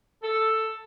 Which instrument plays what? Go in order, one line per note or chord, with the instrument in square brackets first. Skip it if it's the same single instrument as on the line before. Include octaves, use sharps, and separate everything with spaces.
[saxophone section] A4